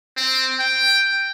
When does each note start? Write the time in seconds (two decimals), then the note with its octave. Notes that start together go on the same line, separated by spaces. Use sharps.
0.17 C4
0.60 G5